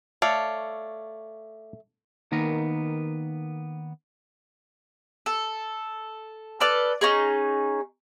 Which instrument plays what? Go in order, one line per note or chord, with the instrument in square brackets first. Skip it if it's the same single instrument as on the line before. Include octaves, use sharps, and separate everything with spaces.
[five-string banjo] A3 [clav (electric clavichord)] C#5 D5 F5
[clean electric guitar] D#3 A#3 B3 A#5
[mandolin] A4
A4 B4 D5 F6
C#4 D#4 G#4